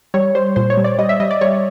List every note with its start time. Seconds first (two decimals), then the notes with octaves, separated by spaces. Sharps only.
0.14 G3 C#5
0.35 G3 C5
0.56 A#2 C5
0.70 C#5
0.77 G3
0.84 D5
0.99 G3 D#5
1.09 E5
1.20 G3 D#5
1.31 D5
1.41 G3 C#5